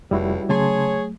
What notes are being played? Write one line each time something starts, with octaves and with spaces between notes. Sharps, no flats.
F1 C#2 G3 E4 F#4
C#3 F#3 A3 G#4 C#5 A5 C6